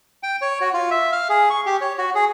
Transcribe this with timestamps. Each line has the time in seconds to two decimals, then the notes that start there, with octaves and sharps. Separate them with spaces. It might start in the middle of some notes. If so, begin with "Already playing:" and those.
0.23 G5
0.42 C#5
0.61 F#4
0.74 F4
0.91 E5
1.12 F5
1.29 G#4
1.50 C#6
1.66 G4
1.81 C#5
1.98 F#4
2.15 G#4